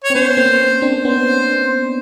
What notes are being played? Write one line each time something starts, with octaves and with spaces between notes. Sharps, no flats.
C#5
C4
B3 C#4 C5
A#3 C4
C4 D4
B3 C#4 C5